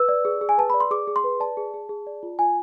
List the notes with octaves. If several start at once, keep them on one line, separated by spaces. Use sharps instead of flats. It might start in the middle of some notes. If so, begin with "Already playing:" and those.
Already playing: B4 E6
D5
G#4
G#4
G#5
B4 A5
D5 B5
C6
G#4 D6
G#4
C6
B4
D5 A5
G#4
G#4
G#4
D5
F4
F4 G#5